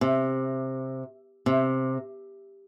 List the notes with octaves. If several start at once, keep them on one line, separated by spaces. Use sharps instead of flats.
C3
C3